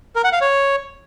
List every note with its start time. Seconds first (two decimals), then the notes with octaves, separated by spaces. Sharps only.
0.16 A#4
0.24 F#5
0.33 F5
0.41 C#5